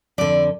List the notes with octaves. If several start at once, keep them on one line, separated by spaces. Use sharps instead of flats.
F2 D3 D5